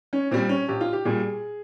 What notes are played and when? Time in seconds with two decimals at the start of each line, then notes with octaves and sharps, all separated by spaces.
0.13 C#4
0.31 A#2 G3 C4
0.49 C#4
0.68 A#1 G4
0.81 F4
0.93 G4
1.05 A#2 G3 G#4